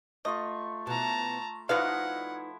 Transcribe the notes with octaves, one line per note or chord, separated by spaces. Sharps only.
A3 F4 D#5 C#6
B2 E3 A5 A#5
F3 D#4 E4 F#4 B4 D5 F5 F#5